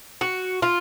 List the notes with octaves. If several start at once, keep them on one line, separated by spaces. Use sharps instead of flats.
F#4
F4